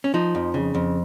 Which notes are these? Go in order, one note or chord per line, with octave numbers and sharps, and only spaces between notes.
C#4
F3 D#4
F2
C#3
F2